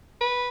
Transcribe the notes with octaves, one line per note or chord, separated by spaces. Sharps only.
B4